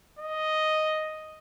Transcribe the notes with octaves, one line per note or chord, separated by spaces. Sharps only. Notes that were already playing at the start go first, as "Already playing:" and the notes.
D#5